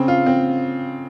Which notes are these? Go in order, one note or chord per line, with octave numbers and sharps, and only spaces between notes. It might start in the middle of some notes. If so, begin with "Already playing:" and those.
Already playing: C#3 C4
F4
C4